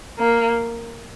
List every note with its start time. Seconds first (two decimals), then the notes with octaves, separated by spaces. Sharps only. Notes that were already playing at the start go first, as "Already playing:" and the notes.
0.18 A#3